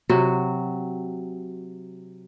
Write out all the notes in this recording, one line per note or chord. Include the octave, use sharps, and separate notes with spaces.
C3 F#3 F#4